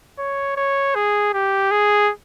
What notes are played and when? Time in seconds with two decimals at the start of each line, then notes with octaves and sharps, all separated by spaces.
0.19 C#5
0.57 C#5
0.95 G#4
1.33 G4
1.71 G#4